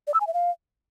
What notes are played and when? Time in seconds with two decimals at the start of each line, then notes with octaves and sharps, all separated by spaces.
0.07 D5
0.14 E6
0.21 G#5
0.27 E5
0.34 F5